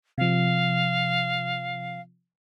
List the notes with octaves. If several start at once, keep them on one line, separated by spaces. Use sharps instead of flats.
C3 F3 F5